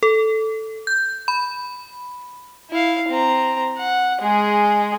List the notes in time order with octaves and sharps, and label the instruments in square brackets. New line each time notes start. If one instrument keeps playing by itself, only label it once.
[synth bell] A4
G6
B5
[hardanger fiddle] E4 F5
C4 A#5
F#5
G#3 G#4